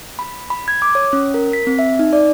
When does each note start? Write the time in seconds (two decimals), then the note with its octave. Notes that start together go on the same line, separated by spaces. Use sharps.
0.19 B5
0.50 B5
0.68 G#6
0.82 D6
0.95 C#5
1.13 C#4
1.34 A#4
1.53 B6
1.67 C4
1.79 E5
1.99 D#4
2.13 D5